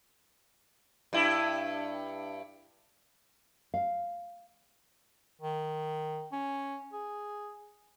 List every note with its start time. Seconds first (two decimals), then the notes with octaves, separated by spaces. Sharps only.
1.13 G2 E4
3.74 F5
5.41 D#3
6.32 C#4
6.93 G#4